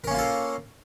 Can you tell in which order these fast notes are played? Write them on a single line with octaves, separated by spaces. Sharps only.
A#4 C#4 A#3 F4 A4